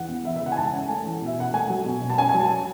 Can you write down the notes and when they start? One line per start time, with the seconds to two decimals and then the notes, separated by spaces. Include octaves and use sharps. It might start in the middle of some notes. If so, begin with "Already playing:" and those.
Already playing: E2 F#5
0.09 B3
0.25 E3 E5
0.36 E5
0.41 C#3 F#5
0.52 G#5
0.57 G#2 A5
0.73 C#4
0.89 A3 G#5
1.06 E3
1.22 B2 E5
1.37 C#4 F#5
1.53 A3 G#5
1.70 F#3
1.85 B2
2.01 B2
2.10 A5
2.17 C#4 G#5
2.29 G#5
2.34 F#3
2.40 A5